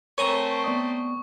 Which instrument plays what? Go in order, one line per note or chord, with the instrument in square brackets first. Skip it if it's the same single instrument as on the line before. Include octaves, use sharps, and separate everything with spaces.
[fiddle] A3 C4 [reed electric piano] A#4 [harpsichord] C#5 G#5 A#5 [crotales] C#6
[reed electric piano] B3 D5 D#6